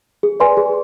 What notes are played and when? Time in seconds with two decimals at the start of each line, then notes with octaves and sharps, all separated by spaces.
0.23 G#4
0.40 B4 D5 G#5 C6
0.57 G#4